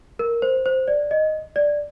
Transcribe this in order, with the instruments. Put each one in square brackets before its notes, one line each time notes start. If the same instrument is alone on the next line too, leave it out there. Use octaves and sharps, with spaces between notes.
[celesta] A#4
C5
C5
D5
D#5
D5